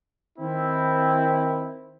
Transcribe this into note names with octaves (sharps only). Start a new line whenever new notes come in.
D#3 C4 E4